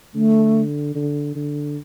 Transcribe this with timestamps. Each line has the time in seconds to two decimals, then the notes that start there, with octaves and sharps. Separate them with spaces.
0.14 D3 A3
0.95 D3
1.35 D3